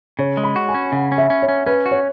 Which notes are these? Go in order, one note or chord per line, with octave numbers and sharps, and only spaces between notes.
C#3 C#5
G#3
B5
F#4
G#5
C#4
C#3 F#5
C#4
E5
C#4
C#5
C#4
C#4 B4
F#4
C#5